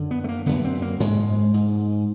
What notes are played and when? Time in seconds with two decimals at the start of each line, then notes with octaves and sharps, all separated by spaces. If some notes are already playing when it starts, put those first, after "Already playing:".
Already playing: F#2 D3
0.11 B3
0.24 A3
0.29 A#3
0.46 F#2 D3 B3
0.65 C4
0.82 A#3
1.00 G#2 G#3
1.54 G#2